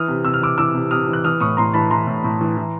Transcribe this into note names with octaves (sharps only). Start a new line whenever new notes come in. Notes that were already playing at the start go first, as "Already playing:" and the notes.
Already playing: E3 D#6 F6
C3
C3 E6
F6
E3 D6 E6
E3 D6 E6
C3
C3 D#6 F6
E3
F#6
E3 D#6 F6
A2 C#6 D#6
A2 A#5 C6
E3 A5 B5
E3 A#5 C6
A2
A2
E3
E3